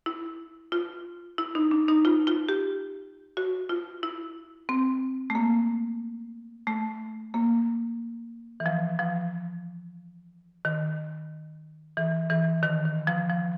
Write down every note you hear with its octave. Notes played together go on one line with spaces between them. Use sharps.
E4
F4
E4
D#4
D4
D#4
F4
F4
G4
F#4
F4
E4
C4
A3
A#3
A3
A#3
E3
F3
F3
D#3
E3
E3
D#3
D#3
F3
F3